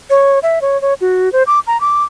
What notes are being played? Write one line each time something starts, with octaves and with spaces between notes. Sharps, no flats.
C#5
E5
C#5
C#5
F#4
C5
D6
A#5
D6